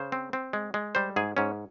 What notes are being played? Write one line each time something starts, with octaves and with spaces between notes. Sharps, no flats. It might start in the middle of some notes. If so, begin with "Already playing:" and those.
Already playing: C#3 C5
C4
C4
G#3
G#3
G3 C5
G#2 G#4
G#2 C#4